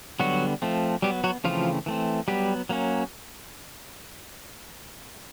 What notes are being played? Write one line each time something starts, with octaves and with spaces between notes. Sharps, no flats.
D3 F#3 G3 B3 F#4
F3 A3 C4
F#3 G3 B3 G4
F#3 F#4
C#3 E3 F3 A3 C4 F4
E3 A3 C4
F#3 G3 B3 G4
F#3 A#3 C#4